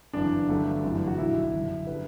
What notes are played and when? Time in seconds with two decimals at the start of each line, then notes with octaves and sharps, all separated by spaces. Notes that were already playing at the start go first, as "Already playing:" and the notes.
0.13 G1 F#2 E3 D4
0.48 G1 G2 F#3 A3
0.83 G1 F#2 E3 G3
1.07 F#4
1.17 B1 A2 G3 E4
1.52 G1 F#2 D3
1.87 D3 G3 B4